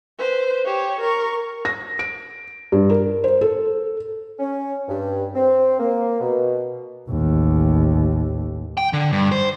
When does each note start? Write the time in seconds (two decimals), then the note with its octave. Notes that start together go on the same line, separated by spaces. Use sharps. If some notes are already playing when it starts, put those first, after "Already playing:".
0.19 B4 C5
0.65 G4 C#5
1.00 A#4 C#6
1.65 A#6
1.99 D7
2.72 G2
2.90 A#4
3.24 C5
3.41 A4
4.40 C#4
4.88 G2
5.35 C4
5.80 A#3
6.20 B2
7.09 A1 D#2
8.77 G5
8.93 D3
9.13 G2
9.32 C5